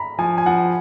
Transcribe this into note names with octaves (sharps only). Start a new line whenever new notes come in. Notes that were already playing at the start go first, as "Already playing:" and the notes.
Already playing: A#5 B5
F3 G#5
G#5
F3 F#5